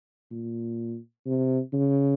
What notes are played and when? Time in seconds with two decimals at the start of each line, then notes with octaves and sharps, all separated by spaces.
0.31 A#2
1.26 C3
1.73 C#3